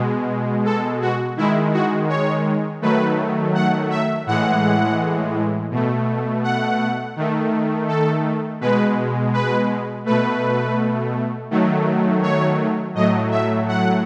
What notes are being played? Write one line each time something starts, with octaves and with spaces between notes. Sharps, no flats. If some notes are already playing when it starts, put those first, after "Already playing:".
Already playing: B2 G#3
A4
F#4
D#3 G#3 E4
F#4
C#5
D#3 F#3 A3 B4
F#5
E5
A2 E3 G#3 F#5
B2 A3
F#5
D#3 A3
A4
B2 G#3 B4
B4
B2 A3 B4
D#3 F#3 A3
C#5
A2 F#3 A3 D#5
E5
F#5